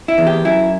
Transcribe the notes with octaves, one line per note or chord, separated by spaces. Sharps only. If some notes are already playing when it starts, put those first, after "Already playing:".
E4
E2
G4
F#2 E4